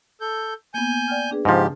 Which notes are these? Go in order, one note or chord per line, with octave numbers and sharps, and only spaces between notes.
A4 G6
A#3 B3 G#5 G6
D5 G5 F6
D4 G#4 B4
G#2 C#3 F3 G4 A#6